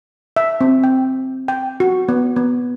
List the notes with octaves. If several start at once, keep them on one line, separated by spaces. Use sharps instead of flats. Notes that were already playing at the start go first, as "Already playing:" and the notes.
E5
C4
G5
G5
F#4
B3
B3